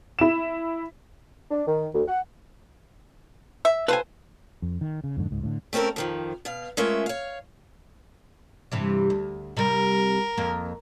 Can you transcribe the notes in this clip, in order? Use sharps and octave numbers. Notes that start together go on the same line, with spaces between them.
E4 E7
D4
D#3
D2
F#5
E5
F4 A4 B4 C5 G#5
F2
D#3
C#3
F2 G#2 D3
C#2 G#2
A2 D3
A3 C4 C#4 A4 A#4
F2 D#3 F3
B2 F5
G#3 A3 C#4 F4 A#4 E5
C#5 F5
G2 C3 E3
D2
C3 G3 A#4
F2 A#3